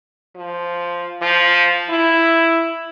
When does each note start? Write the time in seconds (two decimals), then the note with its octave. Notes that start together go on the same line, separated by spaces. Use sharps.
0.36 F3
1.22 F3
1.90 E4